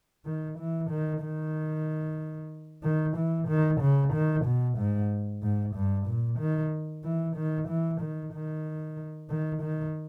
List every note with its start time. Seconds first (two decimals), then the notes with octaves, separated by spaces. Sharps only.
0.26 D#3
0.58 E3
0.90 D#3
1.22 D#3
2.83 D#3
3.17 E3
3.48 D#3
3.81 C#3
4.13 D#3
4.45 B2
4.78 G#2
5.42 G#2
5.75 G2
6.07 A#2
6.39 D#3
7.04 E3
7.36 D#3
7.69 E3
8.01 D#3
8.33 D#3
9.30 D#3
9.62 D#3